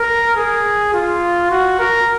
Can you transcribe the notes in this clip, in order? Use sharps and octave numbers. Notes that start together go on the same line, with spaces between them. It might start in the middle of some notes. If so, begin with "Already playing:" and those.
Already playing: A#4
G#4
F4
F#4
A#4